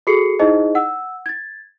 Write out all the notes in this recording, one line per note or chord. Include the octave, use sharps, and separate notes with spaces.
F#4 G#4 A4 C7 C#7
D#4 E4 G#4 C5 D#5
F#5 E6
G#6 A6